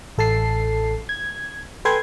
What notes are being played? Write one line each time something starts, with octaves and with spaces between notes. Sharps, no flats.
A1 A4 A5 C7
G#6
A4 B4 G5 G#5 C6 G#6